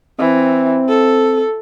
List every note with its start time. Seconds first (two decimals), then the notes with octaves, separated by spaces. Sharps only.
0.19 E3 C4
0.89 A4